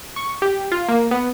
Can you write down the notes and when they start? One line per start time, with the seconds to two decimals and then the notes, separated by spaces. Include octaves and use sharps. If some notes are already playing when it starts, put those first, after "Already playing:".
0.16 C#6
0.42 G4
0.72 F4
0.88 A#3
1.11 B3